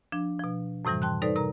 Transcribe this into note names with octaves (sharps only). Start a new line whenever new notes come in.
F3 D4
B2 F3
F#2 A2 C3 E3 G3
G5 A5 C6 F#6
G3 D#4 A4 B4 C5 D5
C3 A#4 A#5